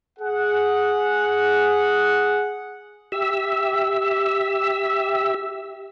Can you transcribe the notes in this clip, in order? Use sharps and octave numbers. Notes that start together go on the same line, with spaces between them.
G#4 F#5
G4 E5 E6